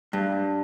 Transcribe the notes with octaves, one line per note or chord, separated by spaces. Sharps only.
G2